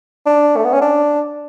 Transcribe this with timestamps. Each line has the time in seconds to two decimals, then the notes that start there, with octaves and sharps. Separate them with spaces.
0.26 D4
0.56 A3
0.65 B3
0.73 C#4
0.81 D4